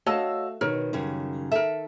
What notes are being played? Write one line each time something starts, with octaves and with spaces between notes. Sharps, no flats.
A3 F#4 C#5 D#5 F5 A5 E6
B2 D#3 A#4 C#5
F#2 C#3 G3
A4 A#4 E5